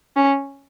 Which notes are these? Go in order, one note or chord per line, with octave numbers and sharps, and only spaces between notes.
C#4